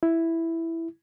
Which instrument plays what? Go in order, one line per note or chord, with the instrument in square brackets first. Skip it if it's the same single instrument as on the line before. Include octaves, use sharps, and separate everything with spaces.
[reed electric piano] E4